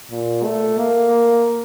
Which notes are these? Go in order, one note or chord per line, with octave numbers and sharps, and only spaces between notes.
A#2
A3
A#3